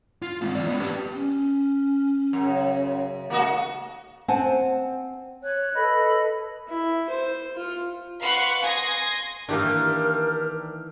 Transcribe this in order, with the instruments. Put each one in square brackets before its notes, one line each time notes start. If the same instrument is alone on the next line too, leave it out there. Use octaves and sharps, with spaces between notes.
[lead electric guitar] F4
G#3 C4
E3 D5
B3 C#4
G4 B4
[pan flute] C#4
[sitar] F#2 [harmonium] C#3
[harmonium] C#3 A3 [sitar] A#3 F#4 D#5
[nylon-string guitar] C4 C5 F#5 G#5 A5
[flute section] C#5 F#6
A4 B4 D#5 B5
[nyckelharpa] E4
C5
F4
[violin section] B4 F5 F#5 C6 C#6 F#6
G#5 C6 D#6 G#6 A#6
[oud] D#3 E3 A#3 [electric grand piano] D4 G4 [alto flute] A#4